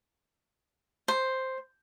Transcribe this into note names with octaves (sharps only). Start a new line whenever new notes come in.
C5